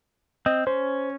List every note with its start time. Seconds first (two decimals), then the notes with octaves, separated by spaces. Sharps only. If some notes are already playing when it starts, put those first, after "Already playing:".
0.46 C4 D#5
0.67 C#4 C5